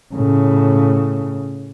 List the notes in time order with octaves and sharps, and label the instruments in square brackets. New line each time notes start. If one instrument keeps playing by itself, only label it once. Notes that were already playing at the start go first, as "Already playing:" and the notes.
[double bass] A2 C#3